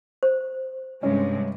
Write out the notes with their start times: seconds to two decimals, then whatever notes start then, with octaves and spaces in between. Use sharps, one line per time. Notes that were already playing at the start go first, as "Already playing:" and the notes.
0.23 C5
1.03 G2 C3 G#3 C#4